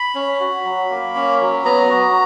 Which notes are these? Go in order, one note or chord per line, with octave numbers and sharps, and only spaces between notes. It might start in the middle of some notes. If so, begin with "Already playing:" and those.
Already playing: B5
C#4
F#4
F#3
A#3
C#4
F#3
B3 A#5
F#4